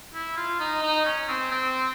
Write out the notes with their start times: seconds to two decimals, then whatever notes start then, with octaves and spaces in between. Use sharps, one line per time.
0.14 E4
0.37 F4
0.60 D#4
0.83 D#4
1.05 C#4
1.28 C4
1.51 C4